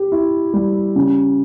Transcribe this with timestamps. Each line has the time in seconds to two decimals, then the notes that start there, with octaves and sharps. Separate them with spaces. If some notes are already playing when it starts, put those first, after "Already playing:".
Already playing: G4
0.12 E4
0.53 G3
0.96 C#3